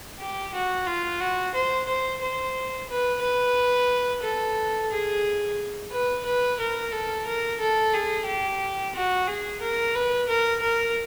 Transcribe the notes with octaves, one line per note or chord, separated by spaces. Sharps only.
G4
F#4
F4
F#4
C5
C5
C5
B4
B4
A4
G#4
B4
B4
A#4
A4
A#4
A4
G#4
G4
F#4
G#4
A#4
B4
A#4
A#4